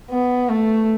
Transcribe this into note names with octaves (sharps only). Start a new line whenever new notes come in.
B3
A3